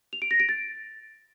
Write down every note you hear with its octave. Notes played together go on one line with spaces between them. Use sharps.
F7
D7
A#6
D7
A6